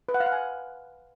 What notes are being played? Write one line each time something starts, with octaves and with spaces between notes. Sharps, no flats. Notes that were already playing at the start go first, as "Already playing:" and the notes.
B4
F#5
F5
F#5
G#5